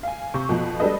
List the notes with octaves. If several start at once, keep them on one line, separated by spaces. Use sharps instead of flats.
F5 G#5
C3 C#6
F2 B2 F3
G3 G#3 D4 A4 B4 D#5